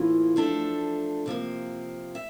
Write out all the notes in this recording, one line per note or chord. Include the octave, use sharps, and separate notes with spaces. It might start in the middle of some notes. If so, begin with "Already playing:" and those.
Already playing: A2 E3 A#3 F4
F3 A3 D4 A4
C3 F3 A#3
E5